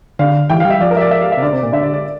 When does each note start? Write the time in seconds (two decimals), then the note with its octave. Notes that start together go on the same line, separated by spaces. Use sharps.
0.19 D3 F5
0.50 E3 G5
0.60 F5
0.65 G3
0.70 E5
0.81 F3 D5
0.91 A#4
0.97 E5
1.01 D5
1.11 E5
1.22 F5
1.32 E5
1.37 C3
1.42 D3 D5
1.53 C3
1.63 A#2
1.72 D3 E5
1.83 D5
1.94 D5